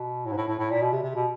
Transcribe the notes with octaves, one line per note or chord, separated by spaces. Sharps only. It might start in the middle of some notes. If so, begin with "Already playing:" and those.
Already playing: B2
A2
G#2
A2
A2
A2
A#2
B2
C3
C3
B2